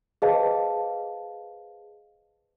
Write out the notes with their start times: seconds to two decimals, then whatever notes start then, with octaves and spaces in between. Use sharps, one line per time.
0.22 G#4 B4 C5 D#5 F5 A5